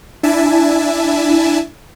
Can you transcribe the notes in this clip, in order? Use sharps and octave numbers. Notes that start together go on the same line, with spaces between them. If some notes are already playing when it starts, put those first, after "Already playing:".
D4 E4 E5 G#5 A5